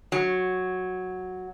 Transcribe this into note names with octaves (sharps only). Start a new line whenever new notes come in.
F#3